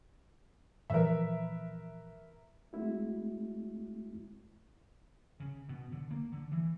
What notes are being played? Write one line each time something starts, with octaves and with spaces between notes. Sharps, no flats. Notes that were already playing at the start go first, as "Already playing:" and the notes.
A#2 E3 F3 A#4 B4 E5
G#3 A3 C4 E4 F#4
C#3
B2
D3
A#3
D3
E3